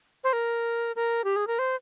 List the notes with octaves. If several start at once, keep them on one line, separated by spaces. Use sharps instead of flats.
C5
A#4
A#4
G4
G#4
A#4
C5